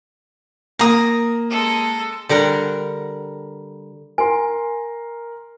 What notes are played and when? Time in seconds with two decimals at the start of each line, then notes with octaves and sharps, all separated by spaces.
0.79 A#3 A#5 D#6
1.50 G#3 A4
2.29 D3 G3 A#4 F#5
4.18 A#4 G#5 C6